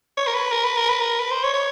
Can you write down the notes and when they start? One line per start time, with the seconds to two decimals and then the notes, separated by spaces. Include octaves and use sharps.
0.17 C#5
0.27 A#4
0.35 B4
0.52 A#4
0.65 B4
0.77 A#4
0.89 B4
1.02 A#4
1.20 B4
1.31 C5
1.43 C#5
1.54 C#5